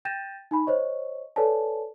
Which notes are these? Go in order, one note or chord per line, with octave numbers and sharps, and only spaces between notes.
G5 G6 A6 A#6 D#7 E7
D#4 G#5 B5
C5 C#5 D#5 C#6
A4 B4 C#5 D5 G#5 A5